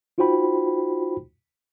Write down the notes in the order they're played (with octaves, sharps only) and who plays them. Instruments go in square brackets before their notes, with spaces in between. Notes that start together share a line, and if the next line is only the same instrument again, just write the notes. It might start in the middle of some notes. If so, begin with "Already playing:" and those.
[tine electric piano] D#4 F4 F#4 C5 G5 B5